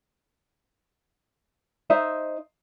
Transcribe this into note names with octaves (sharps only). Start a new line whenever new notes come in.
D#4 C5 D#5 E5